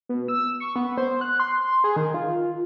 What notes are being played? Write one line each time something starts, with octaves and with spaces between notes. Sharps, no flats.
B2
E6
C#6
B3
C5
F#6
C6
G#4
D#3
F4